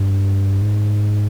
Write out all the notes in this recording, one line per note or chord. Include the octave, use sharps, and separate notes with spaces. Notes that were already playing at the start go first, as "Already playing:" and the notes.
Already playing: G2
G#2